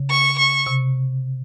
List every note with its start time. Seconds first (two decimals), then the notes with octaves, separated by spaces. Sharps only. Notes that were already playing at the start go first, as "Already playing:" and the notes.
Already playing: C#3
0.10 C#6
0.38 C#6
0.67 C3